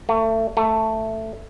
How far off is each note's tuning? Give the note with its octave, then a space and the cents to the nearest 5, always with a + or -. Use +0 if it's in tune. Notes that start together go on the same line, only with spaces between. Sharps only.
A3 +30
A3 +10